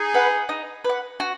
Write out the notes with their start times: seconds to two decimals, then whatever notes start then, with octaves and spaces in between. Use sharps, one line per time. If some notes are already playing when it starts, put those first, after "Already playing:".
Already playing: D#4 G#4
0.14 B4 F#5
0.49 D#4
0.84 B4 F#5
1.20 F#4